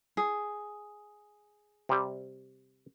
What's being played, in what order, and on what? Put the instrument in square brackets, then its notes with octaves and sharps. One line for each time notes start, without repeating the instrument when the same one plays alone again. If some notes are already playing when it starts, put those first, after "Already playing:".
[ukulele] G#4
[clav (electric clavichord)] C3 G3